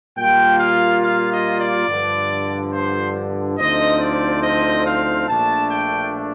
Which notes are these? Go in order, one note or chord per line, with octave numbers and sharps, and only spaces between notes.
A#2 G3 A#3 F4 G5
F5
F5
D#5
D5
G2 D3 F3
C5
D2 D3 F3 C4 D#4 D#5
D5
D#5
F5
A#1 A#2 A3 D4 A5
G5